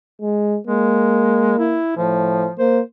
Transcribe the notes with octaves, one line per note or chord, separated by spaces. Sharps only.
G#3
G#3 A#3
E4
A2 F3
A#3 C5